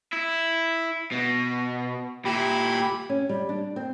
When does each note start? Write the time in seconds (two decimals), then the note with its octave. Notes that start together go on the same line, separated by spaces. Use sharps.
0.13 E4
1.12 B2
2.25 A#2 E4 G4 B5
3.09 C#4
3.29 G3
3.49 D4
3.76 C4